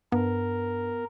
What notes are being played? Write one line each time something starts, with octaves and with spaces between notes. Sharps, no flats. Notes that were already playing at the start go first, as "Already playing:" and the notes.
G2 B3 A#4